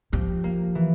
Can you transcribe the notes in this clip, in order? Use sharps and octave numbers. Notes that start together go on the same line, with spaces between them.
F3 G4
A#3
E3